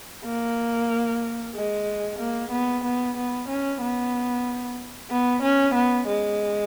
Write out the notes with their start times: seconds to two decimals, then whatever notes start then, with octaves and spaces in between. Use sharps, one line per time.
0.25 A#3
1.55 G#3
2.19 A#3
2.51 B3
2.84 B3
3.17 B3
3.48 C#4
3.81 B3
5.11 B3
5.43 C#4
5.74 B3
6.07 G#3